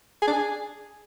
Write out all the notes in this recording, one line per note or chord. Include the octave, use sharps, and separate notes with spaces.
G#4
D4
G#4